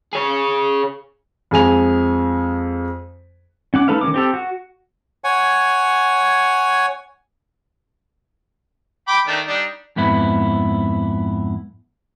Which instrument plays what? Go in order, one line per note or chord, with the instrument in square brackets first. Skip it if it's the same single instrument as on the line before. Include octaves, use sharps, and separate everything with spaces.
[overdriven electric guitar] G#4 C#5
[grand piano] F2 G#3 G#5 F7
[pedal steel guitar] C#4 F#5 D6
A3 D#4 A4 B4 F5
D#3 G3 C#4 D6
C4 G4 A4
F#4
[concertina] C#5 F#5 G#5
[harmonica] G5 B5 D6
D#3 A3 D4
G3 D4 D#4
[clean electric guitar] F2 G#2 B3 E4